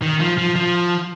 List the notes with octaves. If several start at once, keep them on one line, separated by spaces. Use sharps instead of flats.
D#3
F3
F3
F3